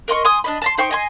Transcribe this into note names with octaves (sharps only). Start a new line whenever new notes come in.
A#4 D#5 C6 C#6
G#5 C6 D#6
D4 D#5 B5
A5 A#5 C6
D#4 C5 G5 C#6
D#5 G#5 C6